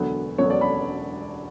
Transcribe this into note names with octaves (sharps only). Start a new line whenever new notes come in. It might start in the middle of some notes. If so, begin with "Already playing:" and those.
Already playing: E1 D2 D3 F#3 B3 B4
E1 D2 D3 F#3 B3 C#5
D5
B5